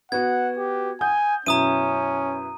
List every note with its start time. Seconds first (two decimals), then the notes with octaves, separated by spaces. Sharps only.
0.12 B3 F#4 F#5 G#6
0.58 G4
1.01 F#5 G#5 D#6 G6
1.46 F#2 B2 C#4 E4 A#5 D#6 D#7